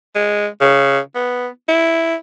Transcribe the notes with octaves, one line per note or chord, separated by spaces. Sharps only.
G#3
C#3
B3
E4